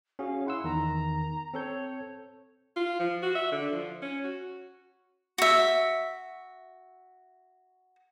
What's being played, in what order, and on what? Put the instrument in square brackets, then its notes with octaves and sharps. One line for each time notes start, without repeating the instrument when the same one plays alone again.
[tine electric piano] C#4 F#4 G#4 [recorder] F5
[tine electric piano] E4 F#5 E6 [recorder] C6
[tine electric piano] E2 D#3 [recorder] A#5
[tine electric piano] C4 A4 G6 [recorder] C#5
[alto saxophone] F4
F3
F#4
E5
D3
F3
C#4
F#4
[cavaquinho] F#4 E5